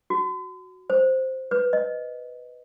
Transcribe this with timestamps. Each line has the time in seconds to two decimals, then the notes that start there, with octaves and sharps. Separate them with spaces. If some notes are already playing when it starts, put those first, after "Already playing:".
0.10 F#4
0.90 C5
1.51 B4
1.73 D#5